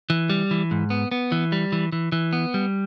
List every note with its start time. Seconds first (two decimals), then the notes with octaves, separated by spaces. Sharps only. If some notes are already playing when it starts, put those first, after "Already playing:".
0.10 E3
0.30 G3
0.51 E3
0.71 G#2
0.90 B3
1.12 B3
1.32 E3
1.52 G3
1.72 E3
1.92 E3
2.12 E3
2.33 B3
2.54 G3